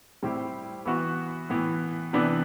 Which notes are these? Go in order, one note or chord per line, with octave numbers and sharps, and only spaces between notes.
A2 G3 C4 E4 G4
E3 B3 F#4
A2 E3 B3
C3 E3 B3 D4